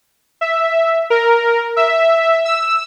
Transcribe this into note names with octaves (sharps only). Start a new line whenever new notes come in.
E5
A#4
E5
E6